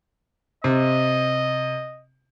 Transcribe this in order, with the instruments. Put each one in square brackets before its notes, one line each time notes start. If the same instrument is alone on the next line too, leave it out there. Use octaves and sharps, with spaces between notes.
[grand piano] C3 [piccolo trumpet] D#5